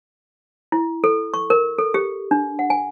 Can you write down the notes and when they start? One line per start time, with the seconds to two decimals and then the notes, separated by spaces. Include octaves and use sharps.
0.72 E4
1.04 A4
1.34 C#6
1.50 A#4
1.79 A4
1.94 G4
2.31 D4
2.59 F#5
2.70 G#5